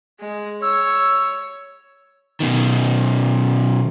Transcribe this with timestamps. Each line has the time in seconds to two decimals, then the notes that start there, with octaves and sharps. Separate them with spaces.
0.20 G#3
0.62 C#5 E6
2.40 B2 D#3